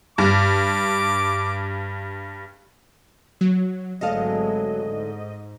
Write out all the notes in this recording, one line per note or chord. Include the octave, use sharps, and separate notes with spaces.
G2 D6
F#3
G#1 D2 F#3 G#3 A4 D#5 F5
G#2